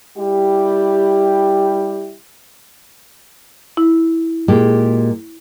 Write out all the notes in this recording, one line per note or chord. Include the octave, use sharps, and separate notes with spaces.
G3 E4 G4
E4
A#2 G#3 G4